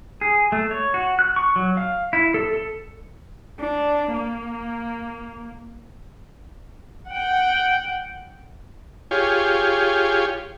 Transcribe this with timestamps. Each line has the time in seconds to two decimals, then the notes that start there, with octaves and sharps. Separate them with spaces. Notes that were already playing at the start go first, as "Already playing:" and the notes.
0.21 G#4
0.52 A3
0.71 C#5
0.94 F#4
1.19 F#6
1.36 C#6
1.56 F#3
1.77 F5
2.13 E4
2.34 A4
2.53 A4
3.60 D4
4.13 A#3
7.10 F#5 G5
9.11 F4 G4 G#4 C#5